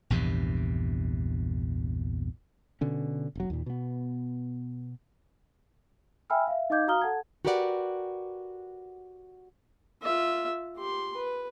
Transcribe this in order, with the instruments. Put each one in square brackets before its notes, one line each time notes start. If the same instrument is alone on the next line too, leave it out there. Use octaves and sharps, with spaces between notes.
[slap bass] A#1 E2 G2 C3
[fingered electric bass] B2 D3 C#4
E1 F#3
D#2 A#2
B2 B3
[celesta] E5 G5 G#5 B5 E6 F6
E5 F5
D#4 D#5 F5 D6 G6 G#6
F#4 F5 A#5 D#6 F6 G7
A4 F#5 A5 G#6
[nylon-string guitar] F#4 G4 A#4 B4 D5 F#5
[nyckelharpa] F4 E5
G4 C6
B4